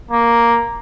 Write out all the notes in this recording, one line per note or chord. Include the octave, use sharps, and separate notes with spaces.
A#3